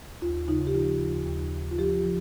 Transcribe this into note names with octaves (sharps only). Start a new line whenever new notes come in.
D#2 F4
C#3 D#4
G4
F3 F4
D#2
D#2
D#2
F4
F3 G4
F3